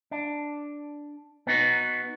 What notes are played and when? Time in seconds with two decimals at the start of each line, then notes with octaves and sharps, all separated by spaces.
0.11 D4
1.47 B3 D#4 F#4